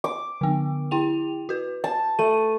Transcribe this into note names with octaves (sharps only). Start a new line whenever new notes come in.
D6
D3 B3
E4 G5 F7
F#4 B4
A5
A3 D#7